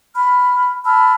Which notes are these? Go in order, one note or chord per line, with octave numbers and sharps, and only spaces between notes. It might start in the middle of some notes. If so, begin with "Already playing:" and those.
B5 F6
A5 B5 E6 F6